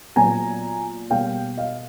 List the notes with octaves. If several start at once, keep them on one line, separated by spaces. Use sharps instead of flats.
A#2 F#3 B3 G#5 A#5
B2 G3 A#3 F5 G5
D#5 F5